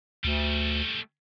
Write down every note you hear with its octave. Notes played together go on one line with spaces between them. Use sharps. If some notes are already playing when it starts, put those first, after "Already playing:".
D2 G3 A3